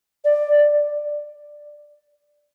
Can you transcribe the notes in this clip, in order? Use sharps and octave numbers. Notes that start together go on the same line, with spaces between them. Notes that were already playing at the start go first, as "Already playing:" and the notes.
D5